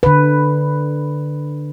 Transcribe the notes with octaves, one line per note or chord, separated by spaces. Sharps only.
D3 B4